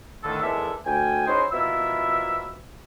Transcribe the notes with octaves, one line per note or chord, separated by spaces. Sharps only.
A2 D3 D#3 A4
E2 D#3 G#3 A4 D5 E5
D2 G5 G#5
C#4 D#4 E4 F#4 G#4 C5
B2 F3 A#3 E4 E5 E6